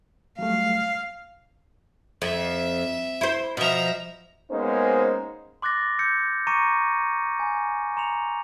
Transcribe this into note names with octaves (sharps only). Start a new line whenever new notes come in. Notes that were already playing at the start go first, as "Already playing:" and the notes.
F#3 G3 A3 F5
F2 E5
E4 C5
B2 F3 E5 A#5
G#3 A#3 B3 C#4 D#4 C5
C6 D6 F#6 A6 A#6
E6 G6 A#6 C#7
A#5 C#6 D6 A#6 C#7 D#7
G#5 A#5
A#5 C6 C#7 F7